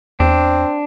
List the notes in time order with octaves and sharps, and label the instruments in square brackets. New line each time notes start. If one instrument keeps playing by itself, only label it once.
[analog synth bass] E2 [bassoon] C4 [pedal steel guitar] D4